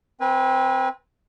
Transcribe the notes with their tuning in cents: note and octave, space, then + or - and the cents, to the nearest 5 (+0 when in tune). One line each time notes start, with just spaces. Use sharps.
C4 +0 B4 -30 G#5 -25